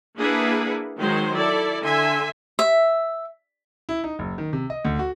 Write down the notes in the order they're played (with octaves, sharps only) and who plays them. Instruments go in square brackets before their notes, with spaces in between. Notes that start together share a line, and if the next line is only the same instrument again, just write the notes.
[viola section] A#3 D4 E4 G#4 B4 F#5
D#3 F#3 G#3 C5
E4 A4 D5
D3 E5 G#5 C6
[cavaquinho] E5
[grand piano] E4
D#4
F#1
D#3
C3
D#5
D2
F#4